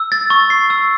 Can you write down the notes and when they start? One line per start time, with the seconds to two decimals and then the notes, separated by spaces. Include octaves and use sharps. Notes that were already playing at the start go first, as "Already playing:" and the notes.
Already playing: E6
0.12 A6
0.30 C#6
0.50 C7
0.70 E6